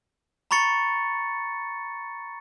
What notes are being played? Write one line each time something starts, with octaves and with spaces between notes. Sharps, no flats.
A#5 B5 C#6 A6 C#7